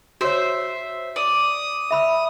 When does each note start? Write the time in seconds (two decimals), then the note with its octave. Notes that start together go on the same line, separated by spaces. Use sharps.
0.21 F#4 C5 C#5 E5
1.16 D5 D#6
1.91 E5 B5 E6